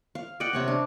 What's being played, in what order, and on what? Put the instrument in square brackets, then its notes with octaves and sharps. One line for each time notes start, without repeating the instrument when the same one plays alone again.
[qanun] F5
D5 D#5 F#5 G5
C3 C#5 G5
D4